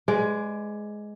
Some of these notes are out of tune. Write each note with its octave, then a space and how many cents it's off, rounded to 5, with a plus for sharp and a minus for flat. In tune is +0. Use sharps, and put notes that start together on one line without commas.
G#3 +10 B4 +40 D5 +0